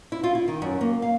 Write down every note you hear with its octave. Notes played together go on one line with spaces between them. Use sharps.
E4
F4
E4
D#3
F#2
A#3
F5